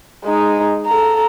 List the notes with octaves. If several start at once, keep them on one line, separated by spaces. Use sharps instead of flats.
G#3 D#4
A4 A#5